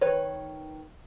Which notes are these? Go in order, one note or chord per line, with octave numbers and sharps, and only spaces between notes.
D#3 B4 C#5